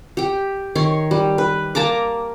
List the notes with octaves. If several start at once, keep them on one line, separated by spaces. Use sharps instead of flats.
G4 G5
D#3 C#5 C6
G3
B4
A#3 A5 A#5 D6